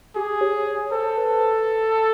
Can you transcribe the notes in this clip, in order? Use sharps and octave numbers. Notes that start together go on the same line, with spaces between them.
G4 G#4
C#5
C#5
A4 C5
B4